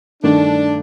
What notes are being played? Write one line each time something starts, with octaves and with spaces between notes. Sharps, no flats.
G2 D#3 A3 D4